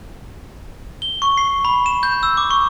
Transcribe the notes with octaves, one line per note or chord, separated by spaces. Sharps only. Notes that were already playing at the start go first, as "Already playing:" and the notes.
G7
C#6
C7
B5
E7
G6
E6
D6
C#6